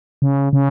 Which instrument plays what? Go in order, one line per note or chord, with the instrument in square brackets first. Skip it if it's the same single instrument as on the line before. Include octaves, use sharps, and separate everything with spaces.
[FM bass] C#3
C#3